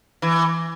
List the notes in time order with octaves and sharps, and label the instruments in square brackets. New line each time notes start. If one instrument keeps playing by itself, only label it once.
[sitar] E3